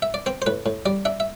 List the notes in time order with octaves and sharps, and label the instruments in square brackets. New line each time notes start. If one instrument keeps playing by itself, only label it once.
[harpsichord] E5
D5
C4 C5
C5
A2 B4
A2
G3 D5
D4 E5
E5